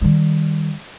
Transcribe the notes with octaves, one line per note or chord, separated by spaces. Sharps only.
D#3 G3